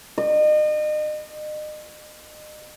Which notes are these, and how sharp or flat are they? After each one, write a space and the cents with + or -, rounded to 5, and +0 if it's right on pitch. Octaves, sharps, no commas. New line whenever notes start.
D#5 -35